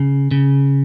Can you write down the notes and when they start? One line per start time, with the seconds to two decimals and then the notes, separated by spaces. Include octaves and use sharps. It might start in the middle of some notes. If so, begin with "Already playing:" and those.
Already playing: C#3
0.31 C#3